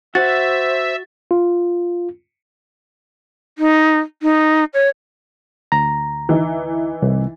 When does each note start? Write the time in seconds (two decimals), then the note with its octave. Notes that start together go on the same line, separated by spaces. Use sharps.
0.15 F#4 C5 E5 A6
1.31 F4
3.58 D#4
4.22 D#4
4.74 C#5
5.72 D2 A#5
6.29 E3 D#4
7.02 C2